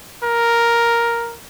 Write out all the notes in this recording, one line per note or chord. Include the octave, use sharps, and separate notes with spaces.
A#4